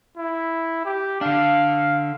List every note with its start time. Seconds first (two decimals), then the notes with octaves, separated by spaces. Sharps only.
0.17 E4
0.85 G4
1.21 D3 D4 F5